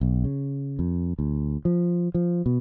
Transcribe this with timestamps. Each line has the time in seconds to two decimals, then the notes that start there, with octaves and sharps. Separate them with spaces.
0.01 B1
0.24 C#3
0.79 F2
1.19 D2
1.65 F3
2.14 F3
2.46 B2